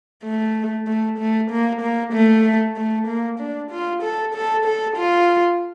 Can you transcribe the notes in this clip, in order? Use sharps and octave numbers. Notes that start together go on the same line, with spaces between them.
A3
A3
A3
A#3
A#3
A3
A3
A#3
D4
F4
A4
A4
A4
F4